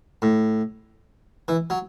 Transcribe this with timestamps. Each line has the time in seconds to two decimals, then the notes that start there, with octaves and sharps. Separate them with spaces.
0.22 A2
1.48 E3
1.70 F#3